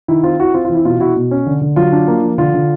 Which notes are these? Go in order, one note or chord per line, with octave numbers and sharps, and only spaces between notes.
D#3 E4
C4 F4
C4 E4 F#4
C4 F4
F4
E3
E4
B2 F4
B2 E4 F#4
B2
C#4
D3
D3
F#3 F4
D4
A#3
F3
D3 F4
D3